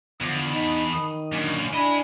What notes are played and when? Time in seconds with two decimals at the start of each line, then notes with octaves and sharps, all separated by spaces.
0.21 E2 D3 F3 D#6
0.50 D#4 A5 B5
0.93 D#3 D#6
1.32 F#2 A#2 D3
1.73 D4 E4 D#5 G#5 B5